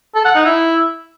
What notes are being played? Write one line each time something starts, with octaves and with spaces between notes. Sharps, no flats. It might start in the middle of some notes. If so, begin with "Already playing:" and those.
A4
F#5
D#4
E4